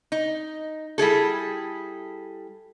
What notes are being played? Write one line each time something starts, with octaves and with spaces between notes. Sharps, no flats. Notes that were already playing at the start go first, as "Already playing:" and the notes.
D#4
G3 E4 G#4 A4